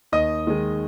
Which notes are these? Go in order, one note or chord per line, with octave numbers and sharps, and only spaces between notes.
D#2 D#5 D#6
D#3 G#3